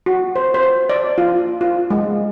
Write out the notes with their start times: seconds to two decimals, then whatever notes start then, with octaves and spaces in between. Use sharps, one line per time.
0.06 F#4
0.36 C5
0.54 C5
0.89 D5
1.18 F4
1.61 F4
1.90 G#3